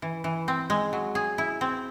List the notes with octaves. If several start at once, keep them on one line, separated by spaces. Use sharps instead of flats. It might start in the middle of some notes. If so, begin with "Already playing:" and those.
E3
E3
C4
G#3
F#3
G#4
E4
C4